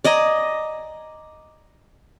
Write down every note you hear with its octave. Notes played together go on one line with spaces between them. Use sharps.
D5 D#5 G#5 A#5